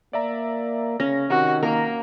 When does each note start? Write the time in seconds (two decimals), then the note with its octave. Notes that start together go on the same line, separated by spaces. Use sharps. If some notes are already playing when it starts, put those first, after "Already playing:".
0.13 A#3 D5 E5 A#5
1.00 C#3 C#4 A#6
1.30 C3 D#3 F#4
1.63 A#3 A#4